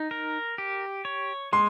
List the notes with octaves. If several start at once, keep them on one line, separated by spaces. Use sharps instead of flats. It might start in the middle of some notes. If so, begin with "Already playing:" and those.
Already playing: D#4
A#4
G4
C#5
G#3 C6